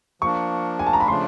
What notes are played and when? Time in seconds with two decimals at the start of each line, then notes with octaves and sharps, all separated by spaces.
0.22 F3 A#3 D4 C#6
0.79 G#5
0.86 A5
0.93 A#5
1.00 B5
1.07 C#3 F3 A3 D4 C6